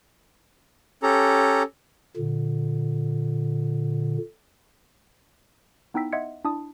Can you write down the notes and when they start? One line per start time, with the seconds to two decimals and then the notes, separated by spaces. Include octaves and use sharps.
1.03 C#4 G4 A4 A#5
2.17 A#2 D3
5.94 B3 D#4 E4 G5 E6 B6
6.13 D#5 E5 F#5 C6 G#6 C#7
6.45 D4 E4 A5 D#6